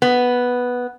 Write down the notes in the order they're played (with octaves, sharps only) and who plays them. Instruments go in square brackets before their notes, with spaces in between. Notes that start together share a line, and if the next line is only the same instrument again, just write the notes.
[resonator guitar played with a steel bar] B3